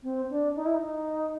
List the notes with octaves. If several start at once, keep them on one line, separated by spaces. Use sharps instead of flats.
C4
D4
D#4
E4
D#4